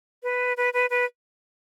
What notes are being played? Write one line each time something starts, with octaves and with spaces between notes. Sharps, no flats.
B4
B4
B4
B4